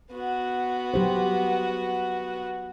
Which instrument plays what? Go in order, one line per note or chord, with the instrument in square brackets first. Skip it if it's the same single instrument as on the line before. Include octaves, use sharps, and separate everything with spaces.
[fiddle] B3 F#4
[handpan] F#3 G4 C5